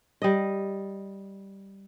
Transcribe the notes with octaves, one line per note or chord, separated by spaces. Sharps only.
G3 D#5